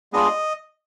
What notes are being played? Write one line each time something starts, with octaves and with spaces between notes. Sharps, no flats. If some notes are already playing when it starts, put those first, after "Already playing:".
G#3 B3 D4 F4 G#4 D#5